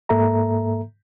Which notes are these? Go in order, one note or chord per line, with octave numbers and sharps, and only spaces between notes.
G#2 A#3 A4 E5 A#5